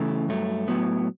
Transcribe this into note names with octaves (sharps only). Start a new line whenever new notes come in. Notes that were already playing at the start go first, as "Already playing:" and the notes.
Already playing: C#3 E3 A3
G2 F#3 A3
A2 F#3 B3